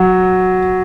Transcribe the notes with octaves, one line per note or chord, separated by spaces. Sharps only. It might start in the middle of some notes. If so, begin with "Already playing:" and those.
Already playing: F#3